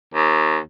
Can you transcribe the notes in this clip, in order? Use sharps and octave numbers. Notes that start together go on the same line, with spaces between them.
D#2